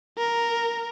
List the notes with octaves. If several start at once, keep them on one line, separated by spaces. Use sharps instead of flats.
A#4